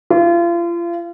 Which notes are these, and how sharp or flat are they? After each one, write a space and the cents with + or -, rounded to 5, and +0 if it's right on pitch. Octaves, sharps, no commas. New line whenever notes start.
F4 -35